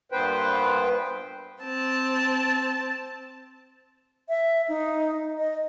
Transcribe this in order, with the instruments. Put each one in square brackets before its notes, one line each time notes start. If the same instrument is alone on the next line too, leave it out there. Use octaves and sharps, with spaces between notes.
[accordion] G2 A#2 B3 B4 C5 G5
[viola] C4 A5
[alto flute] E5
D#4
D#5